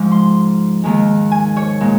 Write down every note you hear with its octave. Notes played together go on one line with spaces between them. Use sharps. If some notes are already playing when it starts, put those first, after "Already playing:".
Already playing: G#2 F3 G#3
C6
D#2 D#3 G#3
G#5
C#5
A#2 G#3